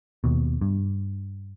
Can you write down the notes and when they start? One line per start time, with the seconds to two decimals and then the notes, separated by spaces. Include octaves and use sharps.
0.24 D#2 B2
0.61 G2